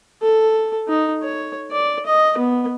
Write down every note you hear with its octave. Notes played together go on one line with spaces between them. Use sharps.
A4
D#4
C#5
D5
D#5
B3